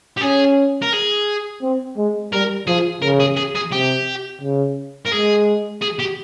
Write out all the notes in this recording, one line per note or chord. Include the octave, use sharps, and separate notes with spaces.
G4
C#4 G#4
A#4
G#4
C4
G#3
G3 A#4
F3 G#4
C#3 A#4
G#4
G#4
G#4
C3 G4
C#3
A#4
G#3 G#4
G#4
G4